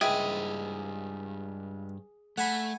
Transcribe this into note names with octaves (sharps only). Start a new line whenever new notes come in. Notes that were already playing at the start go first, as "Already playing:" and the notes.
C#2 G2 G#4 D#5 E5 G5 G#5 B5
A3 F#5 G#5 B5